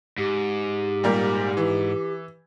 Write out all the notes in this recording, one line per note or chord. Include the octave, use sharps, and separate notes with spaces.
G#2 G4
A#2 G3 A#3
E3